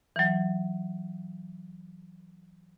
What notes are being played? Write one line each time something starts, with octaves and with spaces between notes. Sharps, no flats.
E3 F#3